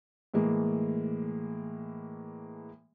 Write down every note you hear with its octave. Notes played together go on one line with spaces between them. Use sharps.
A2 E3 G#3 A#3